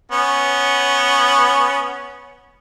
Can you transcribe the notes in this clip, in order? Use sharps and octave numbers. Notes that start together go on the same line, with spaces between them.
B3 C#4